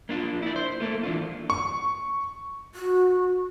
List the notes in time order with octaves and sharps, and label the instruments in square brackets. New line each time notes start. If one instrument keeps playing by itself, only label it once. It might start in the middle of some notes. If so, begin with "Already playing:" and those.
[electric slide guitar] A#3 D4 F4
E4 D5
C5
A3 A#3 A4
E3 D4 F4
[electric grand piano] C#6
[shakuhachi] F#4